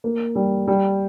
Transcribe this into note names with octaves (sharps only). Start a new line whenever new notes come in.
A#3
G3
G3